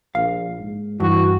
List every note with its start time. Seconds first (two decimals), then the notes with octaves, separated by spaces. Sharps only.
0.15 A#1 F5
0.59 G#2
1.00 G2 E3 F#4